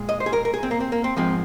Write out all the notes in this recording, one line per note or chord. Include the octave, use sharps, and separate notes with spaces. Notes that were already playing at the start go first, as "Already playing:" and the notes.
Already playing: A#2 G#3
D#5
C5
G#4
A#4
A#4
G#4
C4
A#3
C4
A#3
C4
G#2 F3 G#3 C4